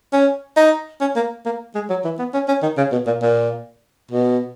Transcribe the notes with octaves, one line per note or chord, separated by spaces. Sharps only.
C#4
D#4
C#4
A#3
A#3
G#3
F#3
E3
B3
C#4
C#4
D#3
C#3
B2
A#2
A#2
B2